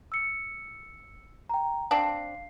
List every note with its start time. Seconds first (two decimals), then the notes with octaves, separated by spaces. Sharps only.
0.12 E6 C#7
1.49 G5 A#5
1.91 C4 D4 F5 C7